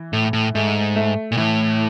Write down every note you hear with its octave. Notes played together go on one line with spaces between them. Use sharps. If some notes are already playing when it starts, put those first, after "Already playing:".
Already playing: E3
A2 A3
A2
G#2 A3
A3
A#2
A2 E3